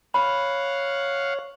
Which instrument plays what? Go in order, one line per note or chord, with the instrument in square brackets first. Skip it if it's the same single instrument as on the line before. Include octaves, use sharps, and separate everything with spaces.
[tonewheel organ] C#5 [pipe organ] F5 F#5 [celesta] B5